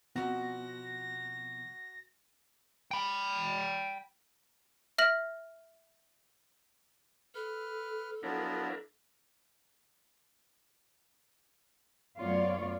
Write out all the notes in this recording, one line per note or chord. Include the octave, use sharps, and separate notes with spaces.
B2 F3 B3 C4 F#4 F#5 A#6
G5 B5
E5 F6 A#6 F#7
A4 B4 F6
F3 F#3 B3 D4 E4 A#4
F#2 A3 B3 F4 C#5 D5